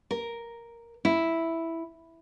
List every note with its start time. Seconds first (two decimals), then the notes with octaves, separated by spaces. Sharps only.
0.11 A#4
1.05 E4